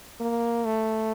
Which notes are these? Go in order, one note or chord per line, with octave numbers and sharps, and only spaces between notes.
A#3
A3